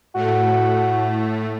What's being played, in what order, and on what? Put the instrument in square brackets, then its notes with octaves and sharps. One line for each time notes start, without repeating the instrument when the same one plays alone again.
[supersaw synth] A2 A3 [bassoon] F#4